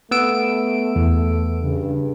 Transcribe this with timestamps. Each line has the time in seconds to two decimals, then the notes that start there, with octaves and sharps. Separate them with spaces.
0.11 A3 B3 E6 D7
0.96 E2
1.62 G2 C#3